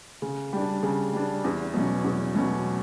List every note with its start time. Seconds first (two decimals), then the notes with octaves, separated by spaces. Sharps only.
0.22 C#3
0.53 G3 D4
0.83 C#3
1.13 G3 D4
1.44 E2
1.74 B2 F#3 C#4
2.04 E2
2.35 B2 F#3 C#4